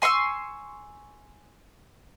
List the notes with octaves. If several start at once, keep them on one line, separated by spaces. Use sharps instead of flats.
G#5 C6 C#6 E6